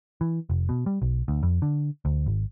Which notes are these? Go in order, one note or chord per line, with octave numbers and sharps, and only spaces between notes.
E3
F1
B2
G3
B1
D2
F2
D3
D2
G#1